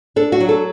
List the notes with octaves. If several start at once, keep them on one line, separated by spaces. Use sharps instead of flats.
D4 A4
F#4
F#3
A4